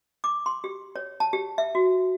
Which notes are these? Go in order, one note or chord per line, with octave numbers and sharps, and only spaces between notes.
D6
C6
G4
C#5
A5
G4
E5
F#4